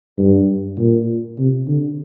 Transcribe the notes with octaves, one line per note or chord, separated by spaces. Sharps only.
G2
A#2
C3
D3